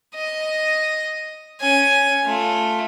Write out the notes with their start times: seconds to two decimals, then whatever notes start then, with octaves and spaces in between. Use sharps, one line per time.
0.15 D#5
1.60 C#4 G#5
2.25 A3 F4